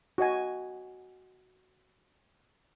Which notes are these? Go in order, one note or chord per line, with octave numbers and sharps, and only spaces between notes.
F#4 C#5 D#5 G#5